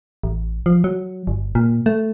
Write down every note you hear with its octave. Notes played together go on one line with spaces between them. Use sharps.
A1
F3
F#3
G1
A#2
A3